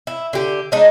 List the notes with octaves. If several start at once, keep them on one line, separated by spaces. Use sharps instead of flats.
E4
D3 G4
G#3 D4 D#4